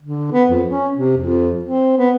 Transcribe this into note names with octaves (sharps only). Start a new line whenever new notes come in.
D3
B3
F2
C#4
C3
F2
C4
B3